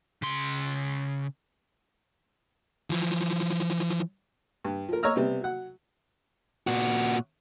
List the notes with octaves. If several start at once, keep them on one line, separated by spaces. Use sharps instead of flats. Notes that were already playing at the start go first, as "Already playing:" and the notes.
C#3 C6
E3 F3
G2
F3 A#4
C#5 D#5 A#5 E6 F6
C3 G3 B3
F#3 F#5
A#2 F#4